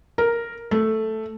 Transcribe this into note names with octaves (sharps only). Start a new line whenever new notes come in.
A#4
A3